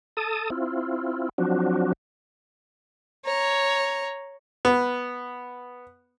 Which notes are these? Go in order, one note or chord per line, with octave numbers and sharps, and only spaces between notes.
A4 A5 D#6
C4 E4 F4
F3 F#3 C4 D4 F#4
C#5 A#5
B3